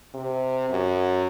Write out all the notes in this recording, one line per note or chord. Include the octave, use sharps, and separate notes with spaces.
C3
F#2